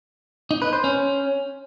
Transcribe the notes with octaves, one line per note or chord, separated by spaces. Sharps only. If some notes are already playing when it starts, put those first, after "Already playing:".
D#4
B4
C5
C#4